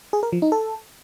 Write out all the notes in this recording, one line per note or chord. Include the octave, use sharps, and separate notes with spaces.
G#4
A#4
F3
D#4
A4